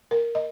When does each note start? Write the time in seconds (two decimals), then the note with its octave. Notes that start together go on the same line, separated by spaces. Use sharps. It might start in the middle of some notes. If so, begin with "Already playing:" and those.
0.11 A#4
0.35 D#5